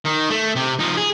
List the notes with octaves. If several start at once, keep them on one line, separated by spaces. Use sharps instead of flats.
D#3
A3
C3
F3 D#4
G#4